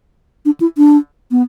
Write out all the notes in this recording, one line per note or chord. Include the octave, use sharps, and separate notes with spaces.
D4
E4
D4
B3